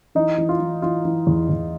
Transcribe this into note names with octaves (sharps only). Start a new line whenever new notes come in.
E3 D#4
E3
F4
E3
E3 F4
E3
E2
E2